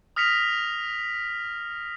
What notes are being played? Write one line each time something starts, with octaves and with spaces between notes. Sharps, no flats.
D#6 F6 A#6 B6 C#7 F7